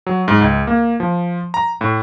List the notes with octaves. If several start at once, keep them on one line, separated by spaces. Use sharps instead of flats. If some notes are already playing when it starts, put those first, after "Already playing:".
F#3
G#2
C#2
A#3
F3
A#5
A2